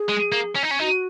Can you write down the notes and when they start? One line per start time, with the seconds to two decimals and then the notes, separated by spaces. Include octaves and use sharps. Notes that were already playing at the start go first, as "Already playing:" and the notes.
Already playing: G#4
0.09 G#3
0.32 A#3
0.55 C#4
0.63 D#4
0.71 C#4
0.79 D#4 F#4